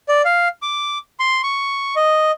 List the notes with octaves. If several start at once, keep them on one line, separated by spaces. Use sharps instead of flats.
D5
F5
D6
C6
C#6
D#5